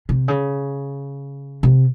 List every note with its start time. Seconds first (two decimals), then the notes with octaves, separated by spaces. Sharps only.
0.09 C3
0.28 C#3
1.63 C3